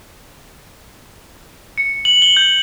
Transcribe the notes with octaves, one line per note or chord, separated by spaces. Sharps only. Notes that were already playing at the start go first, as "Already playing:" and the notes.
C#7
F#7
G7
G6